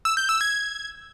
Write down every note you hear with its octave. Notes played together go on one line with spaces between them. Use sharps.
E6
G6
E6
G#6